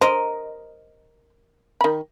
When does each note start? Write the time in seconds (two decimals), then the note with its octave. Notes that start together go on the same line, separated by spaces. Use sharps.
0.01 A#4 C5 D#5
1.81 D#3 B5